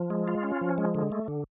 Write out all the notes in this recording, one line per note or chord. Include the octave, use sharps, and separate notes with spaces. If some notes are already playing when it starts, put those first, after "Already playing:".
Already playing: F3
G#3
F4
C#4
F3
G#3
D3
A3
D3